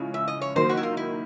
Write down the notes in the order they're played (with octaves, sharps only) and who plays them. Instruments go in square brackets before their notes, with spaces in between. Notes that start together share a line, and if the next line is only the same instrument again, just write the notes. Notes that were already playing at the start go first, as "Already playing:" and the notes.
Already playing: [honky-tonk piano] C#3 F3 G#3 C#4 E4
[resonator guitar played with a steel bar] E5
D#5
C#5
[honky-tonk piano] D#3 F#3 A#3 D#4 [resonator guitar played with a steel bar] C5
[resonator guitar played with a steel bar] F#4
E4
F4
E4